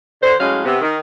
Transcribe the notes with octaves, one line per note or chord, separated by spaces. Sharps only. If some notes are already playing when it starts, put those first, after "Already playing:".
D3 C5
A2 F#3 G#3 C#4 F5
C3 B3
D#3